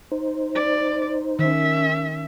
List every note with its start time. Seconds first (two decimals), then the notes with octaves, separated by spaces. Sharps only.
0.12 D#4 C5
0.55 D5
1.39 D#3 C#4 E5